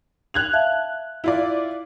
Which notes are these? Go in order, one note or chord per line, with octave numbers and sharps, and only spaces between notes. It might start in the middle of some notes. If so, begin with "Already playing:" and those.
F#6 G#6 F7
E5 F5 A5
E4 F4 D5